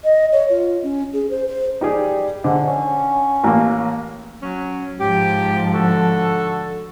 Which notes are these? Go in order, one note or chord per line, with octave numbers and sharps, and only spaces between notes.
D#5
C#5
F4
C#4
G#4
C5
C5
G3 D#4 G4 G#4
G#2 D3
C#4
A1 A#3
F#3 C#4
G#2 F3 G4
D3 F#4 A4